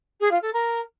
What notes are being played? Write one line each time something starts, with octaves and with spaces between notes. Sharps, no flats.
G#4
F4
A4
A#4